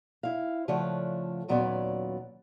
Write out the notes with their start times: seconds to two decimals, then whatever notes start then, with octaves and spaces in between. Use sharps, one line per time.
0.23 E4 F5
0.68 C#3 F3 A3 D4 C#5 F#5
1.48 D#2 A#2 F#3 B3 C#4 D5